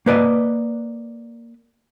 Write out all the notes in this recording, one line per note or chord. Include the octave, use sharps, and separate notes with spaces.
A#3 B4 D5 D#5